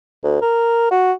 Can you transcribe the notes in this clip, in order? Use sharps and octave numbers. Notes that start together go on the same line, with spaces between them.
D2
A#4
F#4